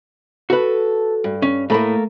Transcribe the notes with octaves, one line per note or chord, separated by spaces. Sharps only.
F#4 A4 B4
G2
C#4
A2 A3 A#3 B5